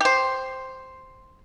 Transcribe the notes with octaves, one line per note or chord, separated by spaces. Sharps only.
G4 C5